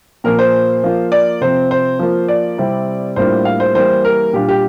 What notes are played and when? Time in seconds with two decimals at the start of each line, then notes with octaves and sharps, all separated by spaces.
0.24 A#2 F3 A#3 A#4
0.39 C5
0.84 F3 A#3 F4
1.12 D5
1.41 C3 F3 C4 C5
1.71 C5
1.99 F3 A#3 F4
2.28 D5
2.58 C3 G3 C4 E4
3.16 A2 G3 A#3 D4 F4 C5
3.45 F5
3.60 C5
3.75 E3 G3 A#3 C5
4.05 A#4
4.33 A#2 G3 D4 F4 G4
4.49 G4